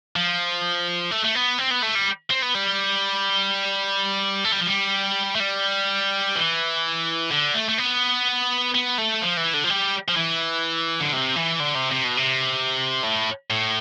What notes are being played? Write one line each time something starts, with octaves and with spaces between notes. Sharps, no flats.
F3
A3
A3
B3
C4
B3
A3
G3
C4
B3
G3
A3
G3
F3
G3
A3
G3
E3
D3
A3
A3
B3
B3
A3
F3
E3
D3
F3
G3
F3
E3
D3
C3
E3
D3
C3
C3
B2
C3
A2
A2